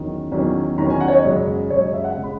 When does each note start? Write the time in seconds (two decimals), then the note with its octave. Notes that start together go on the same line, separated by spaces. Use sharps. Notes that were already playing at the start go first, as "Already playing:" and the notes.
Already playing: E2 D#3 F#3 C#4
0.31 E2 D#3 F#3 C#4
0.78 E2 D#3 F#3 C#4 A#5
0.90 G#5
1.00 F#5
1.08 C#5
1.13 D#5
1.25 F#2 C#3 G#3
1.70 F#2 C#3 G#3 C#5
1.82 D#5
1.93 E5
2.04 F#5
2.17 C#3 G#3
2.23 B5